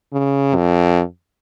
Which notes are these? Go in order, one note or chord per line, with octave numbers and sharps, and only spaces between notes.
C#3
F2